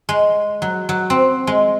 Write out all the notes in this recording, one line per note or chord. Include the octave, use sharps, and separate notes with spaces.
G#3
F#3
F#3
C4
G#3